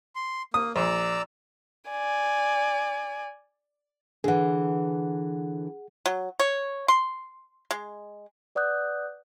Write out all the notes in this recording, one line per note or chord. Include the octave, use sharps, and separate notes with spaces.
C6
A#3 D#6
A#1 D5 A#5 E6
D5 G#5
D3 E3 G#4 F#5
F#3
C#5
C6
G#3
B4 D5 F#5 D#6 F#6 G6